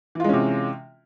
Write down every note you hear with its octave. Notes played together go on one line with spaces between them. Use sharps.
C3 E3 G#3 C#4 F4